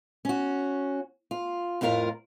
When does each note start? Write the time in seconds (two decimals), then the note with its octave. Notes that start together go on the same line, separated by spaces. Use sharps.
0.25 C#4 F#4
1.31 F4
1.81 F2 A2 F4 A#4 F5